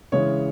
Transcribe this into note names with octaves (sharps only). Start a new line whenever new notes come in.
C#3 E3 G#3 C#5